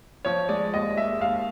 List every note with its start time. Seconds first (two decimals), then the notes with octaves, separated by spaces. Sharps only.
0.25 F3 C#5
0.49 G#3 D5
0.73 D#2 D#5
0.97 G#3 E5
1.20 D#2 F5